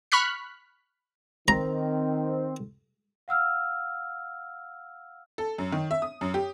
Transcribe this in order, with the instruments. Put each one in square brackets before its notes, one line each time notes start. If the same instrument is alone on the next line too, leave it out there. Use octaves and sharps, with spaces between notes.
[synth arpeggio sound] B5 C#6 F6 F#6 B6
[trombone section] D#3 [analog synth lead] C4 [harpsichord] A#5
[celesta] F5 F#5 E6 F6
[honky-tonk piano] A4
F#2
D#3
E5
D#6
F#2
G4